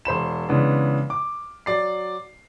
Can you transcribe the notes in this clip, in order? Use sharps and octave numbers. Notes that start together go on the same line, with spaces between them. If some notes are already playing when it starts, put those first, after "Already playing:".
E1 C5 B5 E7
C#3 E3 G#3 B3 D4
D6
F#3 D5 C7